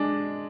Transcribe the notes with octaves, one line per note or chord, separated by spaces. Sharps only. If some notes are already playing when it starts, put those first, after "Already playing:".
Already playing: G#3 D4